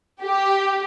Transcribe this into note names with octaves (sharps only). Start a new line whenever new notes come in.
G4